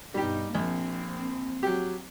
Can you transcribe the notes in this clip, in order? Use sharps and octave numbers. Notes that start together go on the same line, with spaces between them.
G2 B2 G3 D#4 G4
A#1 F3 A#3 C4
F#3 G4